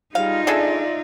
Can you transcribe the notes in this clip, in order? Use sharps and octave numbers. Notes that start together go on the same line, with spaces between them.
G3 D#4 F4 G#4 F5
D4 G#4 A4 D5 E5